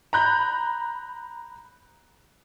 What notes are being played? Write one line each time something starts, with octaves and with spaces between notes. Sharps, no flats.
A#5 B5 F#6 G6